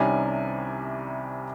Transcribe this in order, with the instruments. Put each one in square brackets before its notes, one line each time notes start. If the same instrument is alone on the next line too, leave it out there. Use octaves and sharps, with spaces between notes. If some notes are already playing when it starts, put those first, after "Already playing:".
Already playing: [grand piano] C2 C3 D#3 G3 C#4 G#5